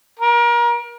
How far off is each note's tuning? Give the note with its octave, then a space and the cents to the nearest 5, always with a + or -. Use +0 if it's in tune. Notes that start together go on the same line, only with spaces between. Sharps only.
A#4 +30